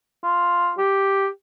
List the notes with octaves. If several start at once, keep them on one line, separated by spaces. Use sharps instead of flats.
F4
G4